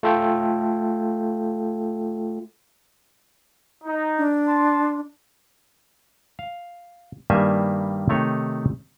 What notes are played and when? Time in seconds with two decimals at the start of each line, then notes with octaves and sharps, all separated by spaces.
0.03 A3 F4 A4 G5
3.84 D#4
4.18 D4
4.47 A5 C6
6.39 F5
7.30 G2 D#3 G3 A#3 E5 G#5
8.09 C3 D#3 A3 D#4 C#5